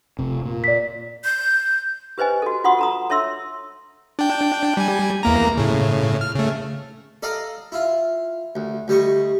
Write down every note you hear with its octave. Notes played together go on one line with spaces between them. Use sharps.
F1 C3
A#2
D5 B6
G6
G4 B4 C5 D#5 G#5
F#4 A4
F4 F#4 F#5 C6 C#6 D#6
A4 A#5 D#6
A4 C#5 E5 C6 E6
D4 G5
G3 G#5
E2 A#3 A#5
A2 C#3
F6
C#3 A3
A4 D5 D#5 F5 A#5
E4 F4
D2
D2 G3 D#5 C#6